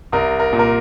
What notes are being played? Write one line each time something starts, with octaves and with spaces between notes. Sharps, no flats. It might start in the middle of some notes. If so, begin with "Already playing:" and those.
C2 A#4
A#4
A#2
A#4